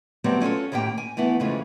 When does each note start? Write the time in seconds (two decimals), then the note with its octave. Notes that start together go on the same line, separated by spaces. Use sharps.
0.24 F#3 G3 A3 B3 C4
0.41 C#4 F4 A4 C#5
0.72 D#2 A2 A#3 G4 G5
0.98 G#5
1.17 E3 A3 B3 E4
1.40 F2 C#3 E3 G#3 A3 F4